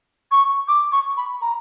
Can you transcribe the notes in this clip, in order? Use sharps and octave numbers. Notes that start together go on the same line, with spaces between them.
C#6
D6
C#6
B5
A#5